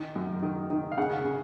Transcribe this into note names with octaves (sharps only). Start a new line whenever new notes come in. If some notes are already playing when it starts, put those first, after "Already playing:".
Already playing: D#3
F#2
D#3
D#3
F5
C#3 F#5
C#3